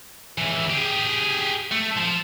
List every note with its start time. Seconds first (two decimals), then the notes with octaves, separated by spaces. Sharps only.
0.38 C#2 E3
0.70 G4 G#4
1.71 A3
1.97 F3